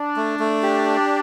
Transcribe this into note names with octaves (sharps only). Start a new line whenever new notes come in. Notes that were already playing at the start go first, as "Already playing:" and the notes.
Already playing: D4
A3
A3
G4